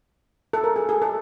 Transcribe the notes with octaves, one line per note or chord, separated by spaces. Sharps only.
A4
A#4
G#4
G#4
A4